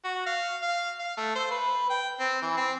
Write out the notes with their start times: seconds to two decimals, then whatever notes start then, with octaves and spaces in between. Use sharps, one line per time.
0.04 F#4
0.27 F5
0.62 F5
0.99 F5
1.17 A3
1.36 C5
1.51 B4
1.90 G5
2.20 C4
2.42 E3
2.57 C4